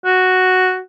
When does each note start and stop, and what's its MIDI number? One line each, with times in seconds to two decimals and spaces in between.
0.05 0.79 66